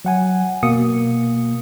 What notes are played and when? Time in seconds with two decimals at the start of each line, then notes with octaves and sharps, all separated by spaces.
0.05 F#3 F#5 G#5
0.63 B2 A#3 D#6 C#7